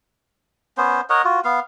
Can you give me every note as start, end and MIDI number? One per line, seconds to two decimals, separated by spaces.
0.77 1.01 59
0.77 1.01 61
0.77 1.01 72
1.10 1.22 70
1.10 1.22 73
1.10 1.22 75
1.10 1.22 78
1.25 1.40 65
1.25 1.40 66
1.44 1.60 59
1.44 1.60 77